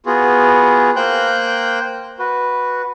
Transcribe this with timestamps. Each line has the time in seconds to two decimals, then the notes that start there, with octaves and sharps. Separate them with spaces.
0.06 B3 F4 F#4 G#4
0.96 A#3 C5 G5 F#6 G6
2.19 F#4 B4